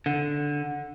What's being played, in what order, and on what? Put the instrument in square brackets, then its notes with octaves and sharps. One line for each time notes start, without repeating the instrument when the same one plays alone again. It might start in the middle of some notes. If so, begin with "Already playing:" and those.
[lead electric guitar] D3